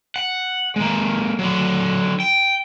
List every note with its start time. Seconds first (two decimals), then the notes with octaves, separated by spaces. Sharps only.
0.16 F#5
0.76 G#3 A#3
1.39 D3 F#3
2.20 G5